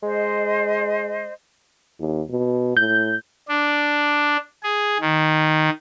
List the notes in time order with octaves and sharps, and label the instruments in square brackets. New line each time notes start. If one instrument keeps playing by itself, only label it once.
[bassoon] G#3 [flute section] C5 D#5
[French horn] D#2
B2
[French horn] A2 [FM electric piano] G6
[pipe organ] D4
G#4
D#3